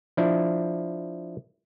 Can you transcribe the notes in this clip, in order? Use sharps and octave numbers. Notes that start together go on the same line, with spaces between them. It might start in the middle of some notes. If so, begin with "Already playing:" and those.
F3 D4 E4